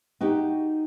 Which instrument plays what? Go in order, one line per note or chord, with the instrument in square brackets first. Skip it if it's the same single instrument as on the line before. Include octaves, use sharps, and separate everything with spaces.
[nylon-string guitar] D#4 F#4 G4